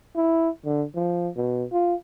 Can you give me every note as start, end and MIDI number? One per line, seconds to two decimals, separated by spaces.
0.16 0.49 64
0.65 0.84 50
0.95 1.29 53
1.36 1.64 47
1.72 1.95 65